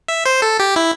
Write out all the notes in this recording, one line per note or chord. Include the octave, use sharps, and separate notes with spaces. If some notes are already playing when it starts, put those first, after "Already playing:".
E5
C5
A4
G4
E4